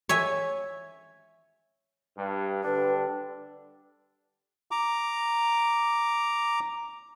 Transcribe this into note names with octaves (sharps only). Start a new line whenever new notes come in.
C#5 E5 G#5
G2
D3 G3 D4 B4
A#5 D6